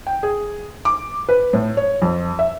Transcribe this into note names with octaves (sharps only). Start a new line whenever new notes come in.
G5
G#4
D6
B4
A2
C#5
F2
E5